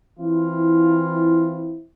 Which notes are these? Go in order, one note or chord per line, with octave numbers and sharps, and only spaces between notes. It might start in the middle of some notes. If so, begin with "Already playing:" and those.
E3 C4 E4 F4